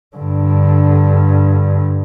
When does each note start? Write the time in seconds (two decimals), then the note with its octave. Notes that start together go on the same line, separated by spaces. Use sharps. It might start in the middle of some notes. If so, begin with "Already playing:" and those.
0.17 G2 D3